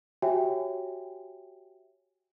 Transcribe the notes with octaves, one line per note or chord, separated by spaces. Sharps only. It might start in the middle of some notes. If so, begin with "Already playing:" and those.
F#4 G4 C#5 E5 G5 G#5